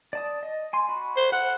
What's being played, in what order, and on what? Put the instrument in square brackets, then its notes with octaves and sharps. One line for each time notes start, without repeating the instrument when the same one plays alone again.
[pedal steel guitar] D5 A5 D#6
D#5
G#5 C6
F#4 B5
[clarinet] C5
[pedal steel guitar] A4 [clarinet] F#5